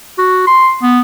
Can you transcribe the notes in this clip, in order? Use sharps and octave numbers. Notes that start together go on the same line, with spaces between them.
F#4
C6
B3